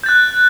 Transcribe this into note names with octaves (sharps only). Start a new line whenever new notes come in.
F#6 G6 A6